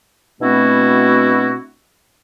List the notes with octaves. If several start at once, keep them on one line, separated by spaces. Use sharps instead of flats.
B2 A3 C4 D4 E4 F#4